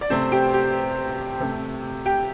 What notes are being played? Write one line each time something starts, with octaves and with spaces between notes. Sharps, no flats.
D5
C3 A3 C4 C5
G4 G5
G4
C3 A3
G4 G5